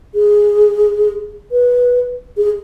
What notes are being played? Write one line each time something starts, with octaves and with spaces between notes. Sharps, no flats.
G#4
B4
G#4